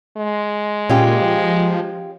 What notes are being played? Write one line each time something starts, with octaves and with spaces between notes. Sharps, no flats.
G#3
A#2 C#4 F4 G4
F3